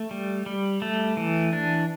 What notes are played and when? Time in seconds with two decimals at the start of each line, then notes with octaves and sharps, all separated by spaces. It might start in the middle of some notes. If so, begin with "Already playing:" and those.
Already playing: A3
0.11 G3
0.46 G3
0.82 A3
1.17 E3
1.53 D4